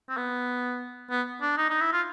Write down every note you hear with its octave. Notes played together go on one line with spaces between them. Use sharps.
C4
B3
B3
D4
D#4
D#4
E4
F4